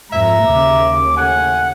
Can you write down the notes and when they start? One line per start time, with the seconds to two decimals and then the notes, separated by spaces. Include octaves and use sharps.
0.10 F2 G#2 E5 A#5
0.46 D#2 C#3 D6
1.17 A2 F#5 G#5